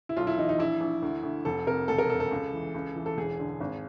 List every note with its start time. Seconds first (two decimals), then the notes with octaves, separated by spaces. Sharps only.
0.09 E4
0.17 B1 F4
0.27 E4
0.38 E3 D#4
0.49 D#4
0.59 A#1 E4
0.81 A#1
1.02 D2
1.23 D2
1.45 F1 A4
1.67 C3 A#4
1.88 E1 A4
1.98 A#4
2.10 C3 A4
2.20 A4
2.31 C#2
2.53 E3
2.74 C#2
2.96 E3
3.06 A4
3.17 E1 G#4
3.39 D3
3.61 G#1